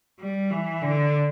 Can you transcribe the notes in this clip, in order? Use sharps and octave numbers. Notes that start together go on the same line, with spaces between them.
G3
E3
D3